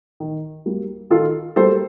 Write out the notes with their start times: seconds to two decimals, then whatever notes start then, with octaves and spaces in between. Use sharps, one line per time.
0.20 D#3
0.66 G3 A#3
1.10 D#3 F4 A4
1.56 G3 A#3 A4 C5